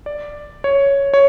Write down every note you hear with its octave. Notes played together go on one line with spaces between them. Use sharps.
D5
C#5
C#5